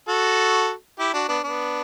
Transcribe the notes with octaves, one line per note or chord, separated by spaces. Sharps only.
F#4 A4
E4 G4
D4 F#4
B3 D4
B3 D4